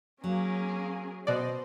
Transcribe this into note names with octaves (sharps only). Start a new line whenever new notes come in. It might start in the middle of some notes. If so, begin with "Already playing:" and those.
F#3 A#3 C#4 G#4 A#4
B2 C5 D5 D#5